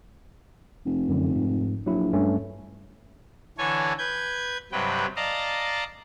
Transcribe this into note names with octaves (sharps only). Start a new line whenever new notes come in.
F1
F#2 D3
G#2
A#1 F#3 E4
G2 A3 C#4
D3 E3 A4 C#5 G#5
B4 G6 G#6
G2 C3 F#3 B4 G5
D5 D#5 F5 A5 A#5